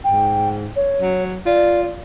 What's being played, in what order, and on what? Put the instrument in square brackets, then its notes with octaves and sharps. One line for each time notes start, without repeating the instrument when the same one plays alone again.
[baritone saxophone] G#2 [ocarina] G5
[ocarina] C#5
[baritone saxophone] F#3
[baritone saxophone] F4 [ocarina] D5